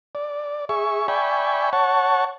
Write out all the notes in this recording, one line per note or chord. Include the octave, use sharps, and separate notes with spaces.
D5
G#4 E5 C#6
D5 E5 G5 G#5 B5 C#6
C#5 F#5 A5 C#6